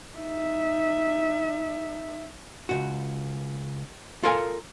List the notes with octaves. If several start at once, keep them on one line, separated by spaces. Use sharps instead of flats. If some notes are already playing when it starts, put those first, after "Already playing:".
D#4 E5
C#2 G#2 F#4
F4 A4 A#4 F5 G#5